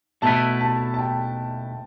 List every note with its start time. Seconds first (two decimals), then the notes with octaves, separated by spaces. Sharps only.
0.22 B2 A3 E4 B4 A5
0.61 A5
0.94 A5
0.99 G5